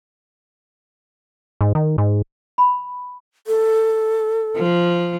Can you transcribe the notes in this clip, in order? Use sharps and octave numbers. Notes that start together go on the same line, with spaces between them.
G#2
D#3
G#2
B5
A4
F3